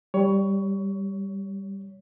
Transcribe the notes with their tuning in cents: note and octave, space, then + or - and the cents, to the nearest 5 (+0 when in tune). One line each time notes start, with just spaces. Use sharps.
G3 +0 C#5 +20